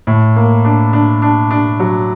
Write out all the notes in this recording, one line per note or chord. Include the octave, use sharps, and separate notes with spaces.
A2
A#3
D4
D4
D4
D4
F#3